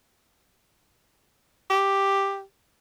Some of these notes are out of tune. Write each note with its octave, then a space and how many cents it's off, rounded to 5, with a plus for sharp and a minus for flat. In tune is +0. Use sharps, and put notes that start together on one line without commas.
G4 +5